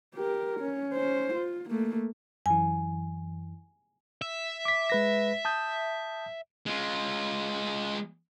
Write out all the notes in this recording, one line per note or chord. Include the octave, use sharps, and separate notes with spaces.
G4 A#4
C#4
C#4 C5
F4
A3 A#3
F#2 E3 G#5
E5
D6 B6
G#3 B4 A#6
A5 D#6 G6
G#3 F4